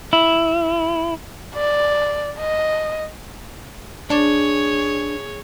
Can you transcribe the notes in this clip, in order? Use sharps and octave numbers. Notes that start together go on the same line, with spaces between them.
E4
D5
D#5
D4 G#4 C#5